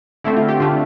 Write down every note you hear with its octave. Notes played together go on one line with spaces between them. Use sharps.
D3 A3 C4 E4
F4
G4
D3 A3 D4 F4